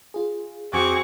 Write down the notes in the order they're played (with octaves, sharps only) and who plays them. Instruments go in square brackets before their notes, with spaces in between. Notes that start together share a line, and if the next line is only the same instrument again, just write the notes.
[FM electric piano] F4 G#4
[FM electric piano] F2 [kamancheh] C4 C#6 [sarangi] F#4 [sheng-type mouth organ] G#4 D6